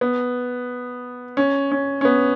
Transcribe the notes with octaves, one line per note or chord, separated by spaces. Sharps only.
B3
C#4
C#4
C#4
B3